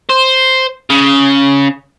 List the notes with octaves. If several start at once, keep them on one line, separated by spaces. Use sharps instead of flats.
C5
C#3